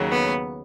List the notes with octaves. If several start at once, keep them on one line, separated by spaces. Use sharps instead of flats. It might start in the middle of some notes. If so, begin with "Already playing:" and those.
Already playing: D#2 C#3 F#3
B3